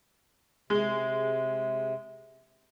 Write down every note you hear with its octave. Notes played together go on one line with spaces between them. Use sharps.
C3 G#3